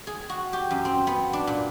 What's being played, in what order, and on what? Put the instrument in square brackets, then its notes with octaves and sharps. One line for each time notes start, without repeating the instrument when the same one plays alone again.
[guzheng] G#4
F#4
G4
F#2
C4
B3
D4
A#2